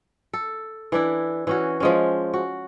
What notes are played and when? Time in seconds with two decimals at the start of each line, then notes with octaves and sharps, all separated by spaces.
0.33 A4
0.92 E3 D4 E4
1.47 E3 C#4 F#4
1.80 F3 G#3 C#4
2.34 F#4